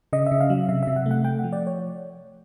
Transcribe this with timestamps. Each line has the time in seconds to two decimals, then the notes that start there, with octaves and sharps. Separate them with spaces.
0.13 C#3 D#5
0.26 E5
0.31 C#3
0.41 F5
0.50 F#3
0.69 C3 E5
0.83 C3 E5
0.96 F#5
1.06 A3
1.11 F#5
1.24 A3 G5
1.39 F#5
1.44 F3
1.53 D5
1.67 C#5